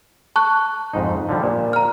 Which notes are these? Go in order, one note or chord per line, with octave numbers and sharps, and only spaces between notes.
A5 C#6 F#6
F2 G#2 D#4
D3 F3 G3
A#2
A#5 F6